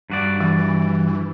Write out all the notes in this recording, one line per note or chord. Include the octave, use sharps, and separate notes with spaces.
G2 F#4 D5
E3